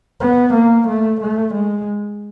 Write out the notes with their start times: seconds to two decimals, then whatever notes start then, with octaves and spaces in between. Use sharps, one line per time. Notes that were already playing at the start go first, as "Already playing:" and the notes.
0.20 B3
0.54 A#3
0.88 A3
1.21 A3
1.54 G#3